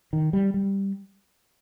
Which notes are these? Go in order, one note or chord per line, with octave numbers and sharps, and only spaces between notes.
D#3
G3
G3